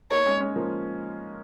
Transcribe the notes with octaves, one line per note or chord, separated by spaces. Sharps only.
A#3 D#4 C#5
G#3 C#4
G#3 C#4
F3 A#3